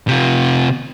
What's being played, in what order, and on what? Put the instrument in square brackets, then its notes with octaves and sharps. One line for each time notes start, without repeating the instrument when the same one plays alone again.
[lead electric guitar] C3 F4